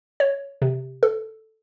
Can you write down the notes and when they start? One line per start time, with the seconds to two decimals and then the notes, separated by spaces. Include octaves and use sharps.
0.20 C#5
0.62 C3
1.03 A4